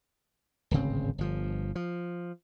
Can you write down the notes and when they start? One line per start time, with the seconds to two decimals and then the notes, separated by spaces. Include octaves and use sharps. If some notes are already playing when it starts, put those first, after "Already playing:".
0.71 D1 G#1 C#3 C4
1.18 G1 F3
1.75 F3